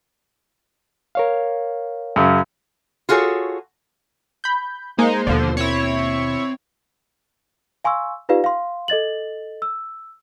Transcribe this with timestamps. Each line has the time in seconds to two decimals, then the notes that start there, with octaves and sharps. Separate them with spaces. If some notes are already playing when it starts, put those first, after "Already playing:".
1.15 A#4 C#5 F5
2.16 F#2 C#3
3.09 F4 F#4 G#4 A4 C#5
4.44 B5 G6
4.99 G#3 A#3 D#4 C5
5.27 D#2 B2 D3 F3
5.57 C4 E4 C#5
7.84 F5 G#5 C6 C#6 E6
8.29 D#4 F4 G4 B4 D5 F5
8.44 F5 C6
8.88 A4 D#5 A6 F#7
9.62 E6